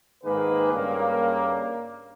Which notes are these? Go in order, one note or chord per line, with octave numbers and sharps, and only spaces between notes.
G#2 D#3 A#3 G#4 B4
G2 C#3 A#3